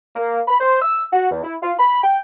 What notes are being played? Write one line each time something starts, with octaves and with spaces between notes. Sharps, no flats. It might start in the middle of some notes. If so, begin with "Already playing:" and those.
A#3
B5
C5
E6
F#4
E2
E4
F4
B5
G5